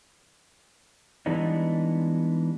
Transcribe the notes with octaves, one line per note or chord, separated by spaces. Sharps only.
E3 G3 G#3 B3 D4 D#4